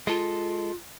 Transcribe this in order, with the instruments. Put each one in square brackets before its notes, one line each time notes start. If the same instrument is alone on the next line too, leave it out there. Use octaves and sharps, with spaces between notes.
[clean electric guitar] G#3 A4 [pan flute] F4